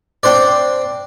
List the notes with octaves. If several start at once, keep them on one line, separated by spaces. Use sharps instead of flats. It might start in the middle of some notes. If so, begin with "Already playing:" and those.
C4 D4 C5 D5